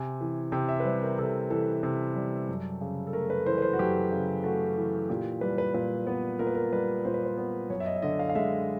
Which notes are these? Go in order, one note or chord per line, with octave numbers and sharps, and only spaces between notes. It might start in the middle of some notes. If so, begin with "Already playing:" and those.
Already playing: C3 G#5
E3
C3 G5
E5
B4
G3 C5
A#4
C3 A4
E3 A4
C3
G3
F#2
C#3
A4
A3 A#4
B4
E3 C5
B4
C5
F#4
F#2 G4
C#3
A3 F#4
E3
A#2 G4
G3 B4
B4
A#2 B4
B3
A#2 A#4
B4
A#4
G3 B4
A#2 C5
B4
C5
B3
F#2 C#5
E5
D#5
E5
D3 D#5
F5
F5
G#3 E5